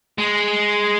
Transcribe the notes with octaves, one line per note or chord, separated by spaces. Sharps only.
G#3